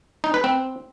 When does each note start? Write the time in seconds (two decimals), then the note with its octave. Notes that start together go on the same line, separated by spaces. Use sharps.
0.24 D#4
0.34 B4
0.44 C4